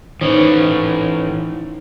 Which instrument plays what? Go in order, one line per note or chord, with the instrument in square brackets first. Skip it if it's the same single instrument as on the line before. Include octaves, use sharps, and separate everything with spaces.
[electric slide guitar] E3 C#4 [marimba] D#4 C5 C#5